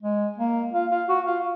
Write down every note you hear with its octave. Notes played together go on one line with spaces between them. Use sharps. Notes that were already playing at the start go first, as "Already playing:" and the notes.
G#3
A#3
F4
F4
F#4
F4